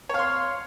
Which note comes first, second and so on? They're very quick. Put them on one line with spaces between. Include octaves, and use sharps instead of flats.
C#5 F5 C6